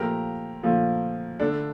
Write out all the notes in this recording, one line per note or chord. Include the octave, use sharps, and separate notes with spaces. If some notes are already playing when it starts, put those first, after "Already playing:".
Already playing: A#2 F3 A3 G4 A#4
A#2 F3 A3
D3 A3 D4